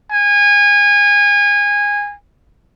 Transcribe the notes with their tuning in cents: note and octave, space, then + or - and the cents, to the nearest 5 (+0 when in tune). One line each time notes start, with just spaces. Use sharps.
G#5 -25